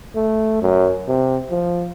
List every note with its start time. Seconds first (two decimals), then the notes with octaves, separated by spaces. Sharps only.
0.15 A3
0.62 F#2
1.08 C3
1.51 F3